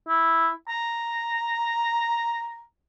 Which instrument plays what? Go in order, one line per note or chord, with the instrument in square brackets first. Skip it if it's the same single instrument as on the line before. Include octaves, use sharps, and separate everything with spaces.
[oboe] E4
A#5